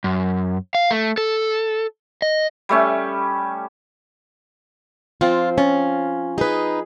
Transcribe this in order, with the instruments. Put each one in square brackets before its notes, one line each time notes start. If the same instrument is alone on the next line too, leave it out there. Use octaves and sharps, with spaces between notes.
[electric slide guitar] F#2
F5
A3
A4
D#5
[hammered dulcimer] G3 A3 C#4
[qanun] F3 C4 C5 [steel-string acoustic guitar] F4
[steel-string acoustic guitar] C#4 [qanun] F4
[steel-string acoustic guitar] D#4 B4 [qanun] G#4